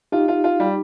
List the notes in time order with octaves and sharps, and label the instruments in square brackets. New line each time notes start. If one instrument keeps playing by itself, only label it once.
[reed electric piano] D#4 G4 [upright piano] F4
[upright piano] F4
F4
G3